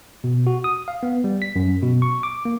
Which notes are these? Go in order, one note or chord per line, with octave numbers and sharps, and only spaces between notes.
B2
F#4
D#6
F5
B3
G3
B6
F#2
B2
C#6
D6
A#3